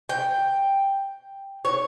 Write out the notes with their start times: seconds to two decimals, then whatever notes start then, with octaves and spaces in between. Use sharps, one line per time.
0.09 G5
1.65 C#5